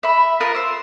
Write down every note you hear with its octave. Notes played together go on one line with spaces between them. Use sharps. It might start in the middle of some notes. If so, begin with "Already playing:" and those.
E5 B5
F4 A#4 B4 D#6
C5 E6